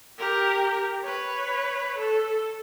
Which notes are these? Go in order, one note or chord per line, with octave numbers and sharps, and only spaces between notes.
G4 A#4
B4 C#5
A4